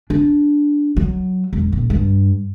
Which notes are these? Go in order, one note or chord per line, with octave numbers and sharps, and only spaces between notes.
D4
F#3
E1
D#1
G2